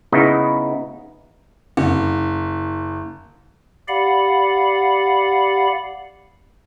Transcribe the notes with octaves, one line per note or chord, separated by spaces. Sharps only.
C#3 B3 D#4 E4
F#1
G4 D5 F5 F#5 B5